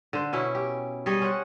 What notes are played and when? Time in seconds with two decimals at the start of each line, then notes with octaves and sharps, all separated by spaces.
0.13 D3 C5
0.33 B2 C#4 E4
0.55 G4
1.06 G3 G#4 C#5 D#5
1.22 C#4 C5 F#5